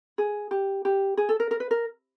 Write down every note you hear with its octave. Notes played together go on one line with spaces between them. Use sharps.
G#4
G4
G4
G#4
A4
A#4
A#4
B4
A#4